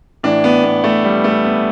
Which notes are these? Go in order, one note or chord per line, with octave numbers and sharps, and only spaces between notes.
A2 E3 D4
B3
B3
A3
G3
A3
B3